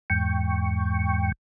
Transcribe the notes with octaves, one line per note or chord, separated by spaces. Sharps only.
E2 G#2 G5 C#6